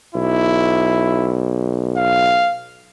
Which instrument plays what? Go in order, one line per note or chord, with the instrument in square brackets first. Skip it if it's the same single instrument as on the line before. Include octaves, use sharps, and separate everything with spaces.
[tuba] B1 [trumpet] E4
[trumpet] F5